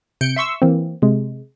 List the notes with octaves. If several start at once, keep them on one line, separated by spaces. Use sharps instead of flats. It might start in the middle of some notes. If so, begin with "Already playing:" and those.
C3 G6 C#7 D7
E5 C6 C#6 E6
E3 A#3 C4
C3 G#3